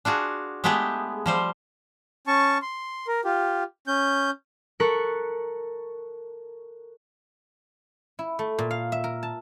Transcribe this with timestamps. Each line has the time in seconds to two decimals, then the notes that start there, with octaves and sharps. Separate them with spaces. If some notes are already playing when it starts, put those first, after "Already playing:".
0.05 D4 F4 F#4 G#4
0.64 G#3 A3 B3 E4 G4 G#4
1.26 F3 G3 C5
2.27 C#4 A5 C#6
2.62 C6
3.07 A#4
3.25 F4 G4
3.87 C#4 G6
4.80 A4 A#4 C#6 F#6 B6
8.19 E4
8.39 A3
8.58 A#2
8.71 F5
8.92 E5
9.04 A#4
9.23 A5